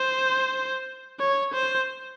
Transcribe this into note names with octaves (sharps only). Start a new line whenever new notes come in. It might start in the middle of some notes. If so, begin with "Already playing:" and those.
Already playing: C5
C#5
C5